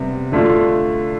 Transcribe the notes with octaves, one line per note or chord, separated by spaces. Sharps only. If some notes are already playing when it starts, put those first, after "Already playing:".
Already playing: C3 G3 B3
D3 A3 D4 F4